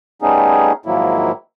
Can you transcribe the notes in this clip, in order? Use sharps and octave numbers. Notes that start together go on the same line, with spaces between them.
G3 A3 B3 C#4 D#4 G#4
G#2 D#3 F3 F#3 A#3 E4